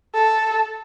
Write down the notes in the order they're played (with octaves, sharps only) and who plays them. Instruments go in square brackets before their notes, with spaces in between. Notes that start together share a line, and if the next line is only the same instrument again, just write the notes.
[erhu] A4